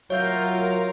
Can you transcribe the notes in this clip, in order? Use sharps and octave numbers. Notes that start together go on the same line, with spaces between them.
F#3 F4 A#4 C#5 E5 G6